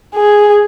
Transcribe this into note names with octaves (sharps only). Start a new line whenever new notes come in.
G#4